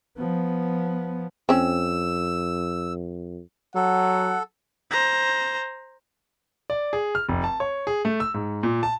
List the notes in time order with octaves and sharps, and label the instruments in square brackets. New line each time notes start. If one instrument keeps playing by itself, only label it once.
[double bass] F3 B3
[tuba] F2 [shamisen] C4 C#4 [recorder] E6
[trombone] F#3 [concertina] A4 [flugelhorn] F#5
[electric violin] C5 A#5
[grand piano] D5
G#4
F6
F1
A5
C#5
G#4
A3
E6
G#2
A#2
A5